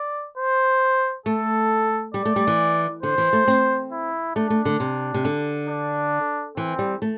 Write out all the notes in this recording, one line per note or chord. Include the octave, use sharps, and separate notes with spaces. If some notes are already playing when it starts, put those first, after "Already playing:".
Already playing: D5
C5
A3 A4
G3 D5
A3
G3
E3
D3 C5
E3
A3
C4
E4
A3 D4
A3
D3
C3
C3
D3
D4
E3 C4
G3
A3